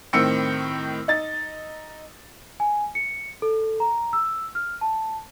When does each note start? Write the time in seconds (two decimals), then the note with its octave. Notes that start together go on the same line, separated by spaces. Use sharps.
0.13 A2 D#3 C4 E6 C#7
1.08 D#4 A6
2.60 G#5
2.95 C#7
3.42 A4
3.80 A#5
4.13 E6
4.55 F6
4.81 A5